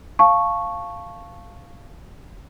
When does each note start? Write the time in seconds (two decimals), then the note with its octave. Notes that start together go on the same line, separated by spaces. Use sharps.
0.19 F5 A5 C#6